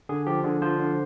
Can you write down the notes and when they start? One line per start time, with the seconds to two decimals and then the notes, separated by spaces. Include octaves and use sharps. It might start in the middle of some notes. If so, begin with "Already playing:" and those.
0.09 D3 G#4
0.27 F3 G4
0.44 D3 G#4
0.62 F3 C5
0.79 D3